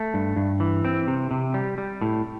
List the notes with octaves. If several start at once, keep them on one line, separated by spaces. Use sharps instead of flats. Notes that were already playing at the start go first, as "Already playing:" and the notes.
Already playing: A3
G2
G2
E3
C4
C3
C3
G3
G3
A2